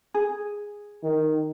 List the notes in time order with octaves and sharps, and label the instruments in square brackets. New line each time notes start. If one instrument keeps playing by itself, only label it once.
[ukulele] G#4
[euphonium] D#3